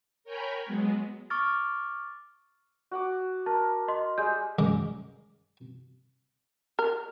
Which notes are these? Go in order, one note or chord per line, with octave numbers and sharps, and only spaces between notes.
A#4 C#5 G5 G#5 A#5 B5
F#3 G#3 B3
C#6 D6 F6 A6
F#4 F#5 D6
A#4 A5
D#5 C6
G3 G#3 G6
F#2 G#3 D#5 D6
A#4